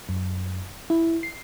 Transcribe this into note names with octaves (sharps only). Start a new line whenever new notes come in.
F#2
E4
C7